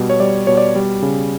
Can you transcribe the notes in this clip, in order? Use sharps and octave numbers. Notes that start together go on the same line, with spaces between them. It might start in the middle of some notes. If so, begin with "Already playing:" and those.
Already playing: B2 G3
C#5
G3 D5
B2 C#5
D5
G3
C#3